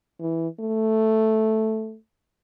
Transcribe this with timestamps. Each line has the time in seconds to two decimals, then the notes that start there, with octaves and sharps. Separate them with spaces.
0.21 E3
0.60 A3